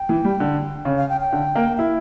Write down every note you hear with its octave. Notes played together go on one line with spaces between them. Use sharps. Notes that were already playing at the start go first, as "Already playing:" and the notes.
Already playing: G5
E3
G3
D3
C#3
F5
G5
G5
D3
A#3
E4 E5